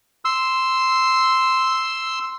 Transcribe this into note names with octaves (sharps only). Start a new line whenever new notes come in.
C6 E6